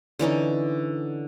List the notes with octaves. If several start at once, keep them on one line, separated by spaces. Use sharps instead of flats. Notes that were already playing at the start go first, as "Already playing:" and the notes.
D3 E3 C#4 D#4